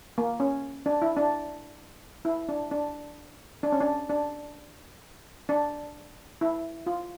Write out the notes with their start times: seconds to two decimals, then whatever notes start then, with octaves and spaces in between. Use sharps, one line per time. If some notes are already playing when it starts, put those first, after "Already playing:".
0.18 A#3
0.40 C#4
0.86 D4
1.02 E4
1.17 D4
2.25 E4
2.49 D4
2.71 D4
3.63 D4
3.72 C#4
3.81 D4
4.09 D4
5.49 D4
6.41 E4
6.87 F4